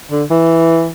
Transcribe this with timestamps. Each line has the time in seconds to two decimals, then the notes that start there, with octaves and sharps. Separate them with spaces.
0.11 D3
0.31 E3